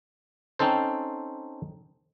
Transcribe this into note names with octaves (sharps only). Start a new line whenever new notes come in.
C4 C#4 D#4 A4 C5